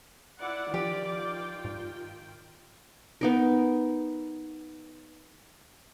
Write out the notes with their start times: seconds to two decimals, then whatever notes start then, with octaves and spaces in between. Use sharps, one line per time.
0.39 E4 D5 F#5 D6
0.74 D#3 F3 F4 G4 G5
1.65 G#2
3.21 B3 D#4 A#4